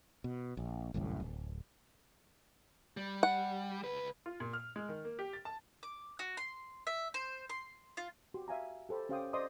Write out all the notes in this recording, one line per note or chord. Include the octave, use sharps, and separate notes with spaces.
B2
A#1
G1 C2 F#2 A2
D1
G3
F#5
C#2 B4
F4
A#2
F6
G#3
D#3
A#3
G4
A6
A5
D6
F#4
C6
E5
C5
C6
F4
F#4 G4 C6
E5 F5 G#5 A#5
G4 A4 C5 B5
C#4 G4 C5 F5 G5 D#6
C5 D5 D#5 C6 D6 D#6